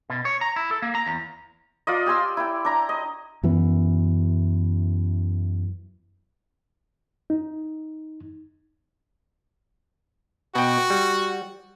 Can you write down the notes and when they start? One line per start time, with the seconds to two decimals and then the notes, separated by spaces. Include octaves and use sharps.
0.10 B2
0.25 C#5
0.41 A#5
0.56 E4
0.71 A4
0.82 A#3
0.95 A#5
1.07 E2
1.87 F4 D5 D#5
2.06 G4 G#5 C6 E6
2.37 E4 G5
2.65 D4 A#5
2.89 D#5
3.43 F#2 E3 B3
7.30 D#4
10.55 B2 F#4 G5
10.90 G3